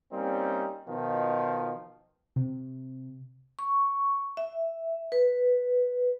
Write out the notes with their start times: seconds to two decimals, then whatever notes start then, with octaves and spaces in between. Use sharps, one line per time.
0.12 G3 A#3 C4 C#4 D#4
0.88 B2 D#3 F3
2.36 C3
3.59 C#6
4.37 E5
5.12 B4